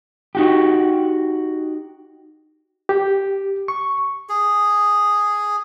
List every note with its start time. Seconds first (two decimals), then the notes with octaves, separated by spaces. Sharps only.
0.35 D#4 F#4 G4
2.89 G4
3.68 C#6
4.29 G#4